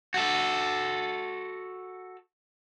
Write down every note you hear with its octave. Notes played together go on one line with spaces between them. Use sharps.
F#4 A4